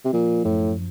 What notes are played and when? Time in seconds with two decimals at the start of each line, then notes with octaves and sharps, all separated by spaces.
0.04 C3
0.13 A#2 F3
0.45 F#2 A2